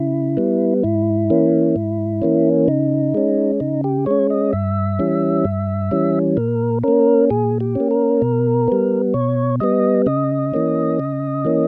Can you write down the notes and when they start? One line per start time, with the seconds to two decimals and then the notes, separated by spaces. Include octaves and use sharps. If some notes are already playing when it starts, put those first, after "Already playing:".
Already playing: C#3 E4
0.37 G3 B3
0.83 G#2 E4
1.30 E3 A#3 C#4
1.76 G#2
2.22 E3 A#3 C#4
2.68 C#3 D#4
3.14 G#3 C#4
3.60 C#3 D#4
3.84 G4
4.06 G#3 C#4 C#5
4.30 D#5
4.53 G2 E5
4.99 E3 G3 C#4
5.45 G2
5.91 E3 G3 C#4
6.37 A#2 A#4
6.83 A#3 C#4 A#4
7.30 A#2 G#4
7.60 G4
7.75 A#3 C#4
7.91 A#4
8.22 B2
8.68 G3 B3
9.14 B2 C#5
9.60 G3 B3 D#5
10.06 C#3 D#5
10.54 E3 A#3 C#4
10.99 C#3
11.45 E3 A#3 C#4